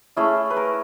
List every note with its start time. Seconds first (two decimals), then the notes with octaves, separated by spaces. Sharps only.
0.16 A3 C#4 E4 G#4
0.50 B4
0.57 A#4